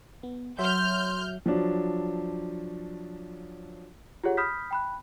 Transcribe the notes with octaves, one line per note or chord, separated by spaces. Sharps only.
B3
F#3 F#4 C#5 E5 C6 F6 G6
F3 F#3 D4
F4 G4 G#4 C#5 F#5
B5 D#6 F6 G6 B6
G5 B5 F#6